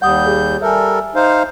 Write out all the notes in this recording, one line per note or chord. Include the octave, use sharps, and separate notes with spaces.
D#2 G3 F#5 D#6 G6
G#4
G3 A4 A#4 E5 G#5
D#4 C5 F5